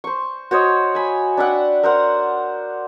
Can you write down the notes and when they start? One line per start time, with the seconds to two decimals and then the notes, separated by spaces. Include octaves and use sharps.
0.04 C5 C#6
0.51 F#4 C5 C#5 D#5
0.95 G#5 B5
1.37 D4 E5 F#5 G5
1.83 A#4 C5 F#5